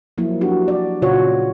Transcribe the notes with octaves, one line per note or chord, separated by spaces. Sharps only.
F3 F#3 A#3 E4
D4 F#4 G4
D5
A#2 C#3 F4 F#4 C#5